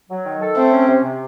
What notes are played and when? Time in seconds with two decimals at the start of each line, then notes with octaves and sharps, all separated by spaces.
0.10 F#3
0.26 D#3
0.41 A4
0.56 A3 C4
0.72 C#4
0.87 C3
1.04 C3